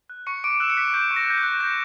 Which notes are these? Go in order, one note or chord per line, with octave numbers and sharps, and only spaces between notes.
F#6
C#6 C#7
C#6 D6 D7
E6 F#6 E7
C#7
F#6 B6
C#6 G6
C#6
A#6
F#6 G6
A#6
F#6
D6 G6